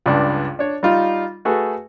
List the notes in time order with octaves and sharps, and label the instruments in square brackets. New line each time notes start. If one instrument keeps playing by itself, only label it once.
[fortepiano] C#2 G2 D4 D6
D4 C#5
G3 D#4 F4
A3 F#4 G#4 A4 B4